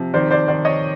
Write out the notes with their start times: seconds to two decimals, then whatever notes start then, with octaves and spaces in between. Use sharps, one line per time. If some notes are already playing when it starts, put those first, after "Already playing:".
Already playing: C3 F3
0.14 D#3 C5 D5
0.31 C5 D5
0.48 D#3 C5 D5
0.65 C#5 D#5